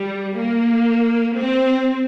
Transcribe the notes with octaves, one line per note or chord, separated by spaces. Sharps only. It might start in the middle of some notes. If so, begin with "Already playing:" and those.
Already playing: G3
A#3
C4